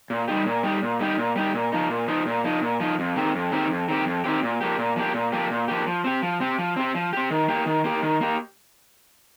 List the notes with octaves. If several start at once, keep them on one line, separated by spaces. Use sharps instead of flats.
A#2
G3 D#4 G4
A#2
G3 D#4 G4
A#2
G3 D#4 G4
A#2
G3 D#4 G4
A#2
F3 D#4
A#2
F3 D#4
A#2
F3 D#4
A#2
F3 D#4
F2
D#3 C4 G4
F2
D#3 C4 G4
F2
D#3 C4 G4
F2
D#3 C4 G4
A#2
F3 A#3 G4
A#2
F3 A#3 G4
A#2
F3 A#3 G4
A#2
F3 A#3 G4
F3
C4 G4
F3
C4 G4
F3
C4 G4
F3
C4 G4
D#3
A#3 G4
D#3
A#3 G4
D#3
A#3 G4